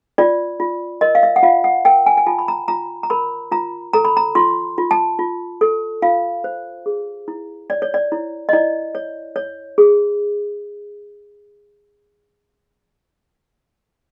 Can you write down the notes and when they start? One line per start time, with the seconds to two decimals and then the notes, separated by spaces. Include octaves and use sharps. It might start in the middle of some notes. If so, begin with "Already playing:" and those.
0.18 F4 D5
0.60 F4
1.01 A#4 D#5
1.15 F5
1.23 E5
1.36 F#5
1.43 F4 F5
1.64 F#5
1.85 A#4 G5
2.06 G#5
2.17 G#5
2.26 F4 A5
2.39 B5
2.48 A#5
2.68 F4 A#5
3.03 A#5
3.10 A#4 B5
3.51 F4 A#5
3.93 A4 A#5
4.05 B5
4.17 A#5
4.35 F4 C6
4.78 F4
4.91 A5
5.19 F4
5.61 A4
6.02 F4 F5
6.44 C5
6.86 G#4
7.28 E4
7.70 C#5 D5
7.82 C#5
7.94 D5
8.12 E4
8.49 D#5
8.53 E4 D5
8.95 C#5
9.36 C#5
9.78 G#4